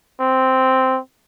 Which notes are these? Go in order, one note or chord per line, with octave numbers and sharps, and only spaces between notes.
C4